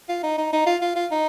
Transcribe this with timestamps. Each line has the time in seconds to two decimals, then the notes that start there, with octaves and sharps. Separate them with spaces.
0.09 F4
0.23 D#4
0.38 D#4
0.53 D#4
0.66 F4
0.81 F4
0.96 F4
1.11 D#4